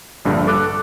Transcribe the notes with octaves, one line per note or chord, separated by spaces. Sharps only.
A#1 G2 D3
A4 D6 F#6